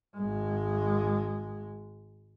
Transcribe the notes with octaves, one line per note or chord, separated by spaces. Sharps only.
G#1 G#3